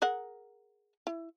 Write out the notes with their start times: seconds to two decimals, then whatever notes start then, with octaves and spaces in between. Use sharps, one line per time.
0.02 G#4 A#4 F#5
1.07 E4